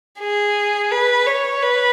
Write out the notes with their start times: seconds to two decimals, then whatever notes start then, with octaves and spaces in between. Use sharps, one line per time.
0.20 G#4
0.91 B4
1.26 C#5
1.62 B4